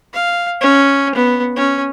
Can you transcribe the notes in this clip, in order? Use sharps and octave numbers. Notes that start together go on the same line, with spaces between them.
F5
C#4
B3
C#4